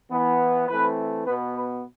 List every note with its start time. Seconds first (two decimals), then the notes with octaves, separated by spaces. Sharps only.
0.11 E3 B3
0.68 E3 A3 C4 B4
1.26 B2 B3 B4
1.55 B4